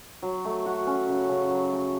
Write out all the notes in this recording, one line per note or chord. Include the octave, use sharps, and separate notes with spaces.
F#3
A3
F#4
C#4
C#3
C#3
F#3
A3